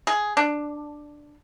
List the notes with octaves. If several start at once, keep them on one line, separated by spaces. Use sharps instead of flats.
G#4
D4